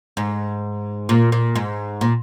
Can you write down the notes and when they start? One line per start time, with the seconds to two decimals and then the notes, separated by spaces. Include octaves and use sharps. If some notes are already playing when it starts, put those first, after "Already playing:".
0.17 G#2
1.09 A#2
1.32 A#2
1.56 G#2
2.01 A#2